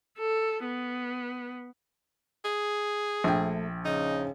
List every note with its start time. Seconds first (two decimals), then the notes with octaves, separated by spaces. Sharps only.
0.19 A4
0.65 B3
2.44 G#4
3.24 A#1 A3 G5
3.85 C#3 D#4